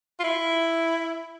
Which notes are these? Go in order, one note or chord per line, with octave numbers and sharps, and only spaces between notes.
F4
E4